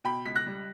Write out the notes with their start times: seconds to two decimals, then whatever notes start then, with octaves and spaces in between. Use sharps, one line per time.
0.04 B2 G5 B5
0.25 C#2 B6
0.35 F#6 A#6
0.46 G3